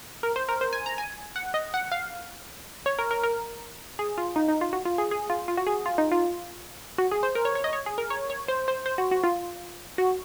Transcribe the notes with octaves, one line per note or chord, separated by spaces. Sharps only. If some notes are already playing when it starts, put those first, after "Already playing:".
A#4
C5
A#4
C5
G#5
A#5
G#5
F#5
D#5
F#5
F5
C#5
A#4
A#4
A#4
G#4
F4
D#4
D#4
F4
F#4
F4
G#4
G#4
F4
F4
F#4
G#4
F4
D#4
F4
F#4
G#4
C5
A#4
C#5
C#5
D#5
C#5
G#4
A#4
C#5
C#5
C5
C5
C5
F#4
F#4
F4
F#4